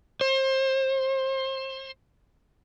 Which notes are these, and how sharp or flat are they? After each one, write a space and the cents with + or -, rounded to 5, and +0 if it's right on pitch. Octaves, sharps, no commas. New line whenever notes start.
C5 +30